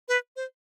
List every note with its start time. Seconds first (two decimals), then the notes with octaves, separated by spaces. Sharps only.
0.08 B4
0.36 C5